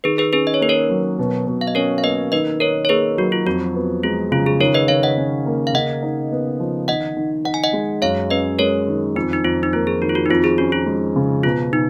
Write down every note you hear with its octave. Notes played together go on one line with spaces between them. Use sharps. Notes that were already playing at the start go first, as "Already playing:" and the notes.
D#3 G#4 B4
G#4 B4
C#4 G#4 B4
D#5
C#5
A#3 B4
A#4 C#5
F#3
B2
B2
F5
D#5
C#4 A#4 C#5
F5
A#3 B4 D#5
D#3 B4 D#5
D#4 A#4 C#5
C#5
A#3 G#4 B4
F#3 F#4
F4
F2 F#4
B3
G#3 F4
C#3 F4
G#4
D#3 A#4 C#5
B4 D#5
D#3 C#5 F5
D#5 F#5
C#4
A#3
F5
C#3 D#5 F#5
D#4
B3
F3
D#3 D#5 F#5
D#3
D#4 F#5
G#5
D#5 F#5
G#3
F#2 C#5 F5
C#4 B4 D#5
G#3 A#4 C#5
D#3
F2 D#4
D#4
F2 F4
D#4
A#3 F4
G#4
D#3 F#4
F4
F#4
D#4
F2 F4
G#4
C#4 F#4
F4
G#3
C#3
B2 F4
B2 D#4